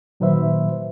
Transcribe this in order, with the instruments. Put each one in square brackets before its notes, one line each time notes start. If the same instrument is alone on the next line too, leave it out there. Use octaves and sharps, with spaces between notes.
[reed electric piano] A#2 D#3 F#3 B4 C5 E5